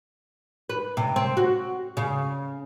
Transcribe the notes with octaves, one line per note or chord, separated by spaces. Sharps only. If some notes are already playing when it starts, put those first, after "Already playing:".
B4
C3
C4
F#4
C#3